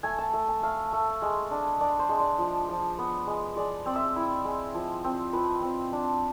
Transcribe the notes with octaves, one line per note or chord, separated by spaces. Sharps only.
A3 G#5
A5
A3
G#5
A3 F5
A3
G#3
D4
D4 D5
C5
G#3
D5
F3
F3
B3
G#3
G#3 D5
C4 D5
E5
E4
G#3
F3
C4
F3 B4
C4
D4